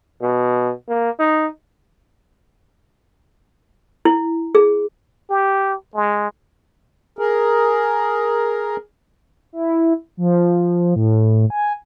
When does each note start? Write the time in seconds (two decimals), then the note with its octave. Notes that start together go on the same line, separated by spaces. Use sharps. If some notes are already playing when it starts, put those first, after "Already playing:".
0.22 B2
0.88 A#3
1.19 D#4
4.05 E4
4.55 G#4
5.30 G4
5.95 G#3
7.19 G#4 A#4
9.53 E4
10.17 F3
10.96 A2
11.50 G#5